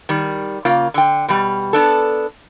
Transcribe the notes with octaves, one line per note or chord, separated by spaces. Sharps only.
D#3 G3
C#3 A#3 F4
D3 G5
B2 G3
B3 D4 A4